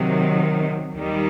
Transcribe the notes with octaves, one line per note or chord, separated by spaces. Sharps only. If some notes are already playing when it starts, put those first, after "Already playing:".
Already playing: C3 D#3 F#3
D#2 D#3 G3